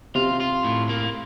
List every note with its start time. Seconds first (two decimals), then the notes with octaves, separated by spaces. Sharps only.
0.15 C3 F4
0.40 F4
0.64 A2
0.89 A#3